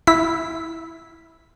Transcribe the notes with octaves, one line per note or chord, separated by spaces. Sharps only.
E4 B6